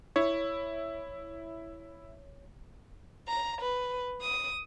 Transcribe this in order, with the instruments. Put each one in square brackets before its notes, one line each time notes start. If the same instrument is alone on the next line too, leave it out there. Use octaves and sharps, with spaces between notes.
[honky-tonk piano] E4 [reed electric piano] C#5
[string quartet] A#5
B4
D#6